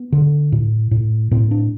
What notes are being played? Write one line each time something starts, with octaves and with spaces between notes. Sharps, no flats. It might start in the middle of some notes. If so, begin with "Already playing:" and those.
Already playing: B3
D3
A2
A2
A2 C4
D4